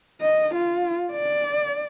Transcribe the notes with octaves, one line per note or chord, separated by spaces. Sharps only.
D#5
F4
D5